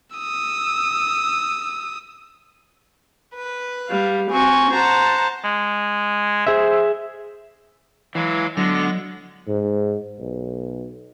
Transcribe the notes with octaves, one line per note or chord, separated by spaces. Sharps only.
D#6 E6
B4
G3 F5
C4 F#4 G#5 C#6
C5 F#5 A5 A#5
G#3
G#4 C5 E5
E3 F#3 G#3 F5
D3 F#3 G#3 B3 A#6
G#2
B1